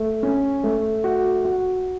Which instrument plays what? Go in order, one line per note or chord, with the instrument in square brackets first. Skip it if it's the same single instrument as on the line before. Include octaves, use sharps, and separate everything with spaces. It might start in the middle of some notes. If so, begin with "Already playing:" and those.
Already playing: [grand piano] A3
C#4
A3
F#4
F#4